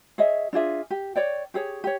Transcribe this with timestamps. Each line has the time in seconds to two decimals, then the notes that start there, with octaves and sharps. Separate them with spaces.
0.18 G#4 C#5 D#5 E5
0.53 D4 F4 G#4 E5
0.91 G4
1.16 C#5 D5 G5
1.54 G4 G#4 C#5
1.84 G4 C#5